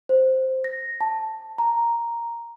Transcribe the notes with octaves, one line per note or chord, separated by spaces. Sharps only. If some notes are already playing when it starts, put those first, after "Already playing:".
C5
A#6
A5
A#5